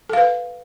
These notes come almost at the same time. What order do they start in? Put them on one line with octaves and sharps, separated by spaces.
A4 F5 B4